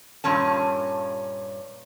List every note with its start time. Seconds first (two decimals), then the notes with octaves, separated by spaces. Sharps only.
0.24 G2 A#2 C#4 A5